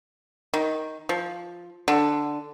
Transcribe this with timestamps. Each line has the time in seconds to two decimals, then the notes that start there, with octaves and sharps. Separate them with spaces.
0.54 D#3
1.09 F3
1.88 D3